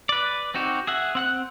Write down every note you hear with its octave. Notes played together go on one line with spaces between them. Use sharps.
B4 D5
C4 D#4 F#4 G4
G#4 E5 F#5
C4 F#5 F#6